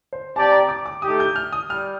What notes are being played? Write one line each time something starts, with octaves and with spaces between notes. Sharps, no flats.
C5
C4 G4 D5 G5 A5
A#5
D6
D6
A3 D#4 G4 D#6
G6
F6
D#6
G3 F6